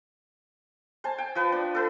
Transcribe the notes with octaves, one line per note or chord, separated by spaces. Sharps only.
C5 G#5 A5
G5
F3 B4 A5
D4
A4 B4